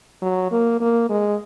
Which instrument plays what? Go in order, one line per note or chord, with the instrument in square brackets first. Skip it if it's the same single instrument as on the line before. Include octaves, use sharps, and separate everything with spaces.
[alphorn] F#3
A#3
A#3
G#3